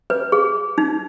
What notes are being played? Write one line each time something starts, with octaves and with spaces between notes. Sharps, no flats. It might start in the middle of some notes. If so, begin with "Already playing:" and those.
B4
G#4
D#4